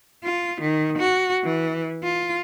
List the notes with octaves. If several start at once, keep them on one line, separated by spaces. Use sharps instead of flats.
F4
D#3
F#4
E3
F4